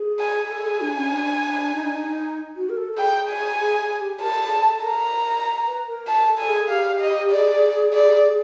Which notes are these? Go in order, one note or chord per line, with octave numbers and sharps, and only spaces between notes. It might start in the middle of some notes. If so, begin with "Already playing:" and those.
Already playing: G#4
G#5
A4 G#5
G#4
D4
C#4
D4
D#4
D4
D#4
F#4
A#4
A4
A4
G#4 G5
G#5
G#4
G#4
G4
A#4 A5
A4
G#4
A4
A4
A#4 A#5
B4
A#4
A5
A4
G#5
G#4
G4 F5
D#5
G#4 D5
D5